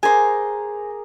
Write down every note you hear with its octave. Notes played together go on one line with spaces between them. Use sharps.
G#4 A#4 C5 G#5 D6